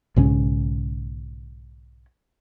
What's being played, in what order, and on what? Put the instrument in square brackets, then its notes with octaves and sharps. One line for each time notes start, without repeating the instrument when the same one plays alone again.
[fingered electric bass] B1 G#2 C#3 C#4